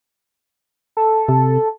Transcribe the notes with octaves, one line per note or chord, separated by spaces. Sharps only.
A4
C3